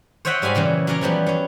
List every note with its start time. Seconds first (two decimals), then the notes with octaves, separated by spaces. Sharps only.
0.25 C5 C#5 D#5 E5 F#5 G5
0.42 G#2 G3 F5 G#5 B5
0.55 A#2 C#3 E3 F#3
0.87 F#3 C#4 A#4 D5 A#5
1.01 E3 F3 G3 B3
1.27 F#3 C#4